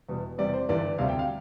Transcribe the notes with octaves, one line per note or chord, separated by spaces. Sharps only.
E2 B2 G3
E2 C3 G3 D5
C5
G1 G2 E3 G3 D5
D2 C3 G3 F5
G5
F5